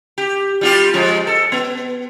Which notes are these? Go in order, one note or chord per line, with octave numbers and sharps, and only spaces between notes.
G4
G3 F4 G4
F3 G#3 F4
A4
B3